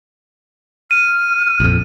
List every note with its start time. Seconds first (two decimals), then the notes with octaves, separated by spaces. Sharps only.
0.91 F6 D#7
1.60 A#1 F2